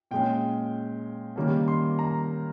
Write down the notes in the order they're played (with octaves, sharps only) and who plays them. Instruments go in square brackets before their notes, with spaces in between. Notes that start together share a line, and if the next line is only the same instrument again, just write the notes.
[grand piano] A#2 G#3 C#4 G5
D#3 G3 A#3 C#4
C6
A#5